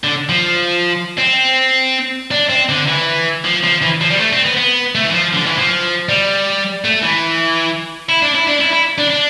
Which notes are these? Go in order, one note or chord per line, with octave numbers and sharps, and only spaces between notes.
D3
F3
C4
D4
C4
D3
E3
F3
F3
E3
F3
G3
A3
C4
B3
B3
A3
E3
F3
D3
E3
F3
G3
A3
E3
E4
D4
E4
D4
E4
E4
D4
D4